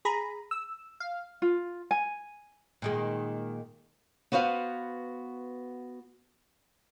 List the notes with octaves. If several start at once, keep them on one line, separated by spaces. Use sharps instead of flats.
G#4 A#5 B5
E6
F5
F4
G#5
A#2 D#3 G#3
B3 F#4 B4 C5 F5